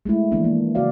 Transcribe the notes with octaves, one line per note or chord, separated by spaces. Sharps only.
G#3 A3 E4
D3 E3 F3 A#3 B3 D4
A#3
C#3 F#4 D5 F5